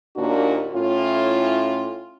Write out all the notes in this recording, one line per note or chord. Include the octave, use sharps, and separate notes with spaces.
D#2 A#2 A#3 D4 F#4
A2 C#4 E4 F4